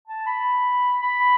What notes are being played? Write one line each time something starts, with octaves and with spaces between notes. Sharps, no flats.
A5
B5
B5